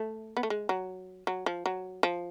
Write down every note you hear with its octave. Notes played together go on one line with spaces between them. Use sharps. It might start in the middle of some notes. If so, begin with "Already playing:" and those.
Already playing: A3
B3
A3
G#3
F#3
F#3
F3
F#3
F3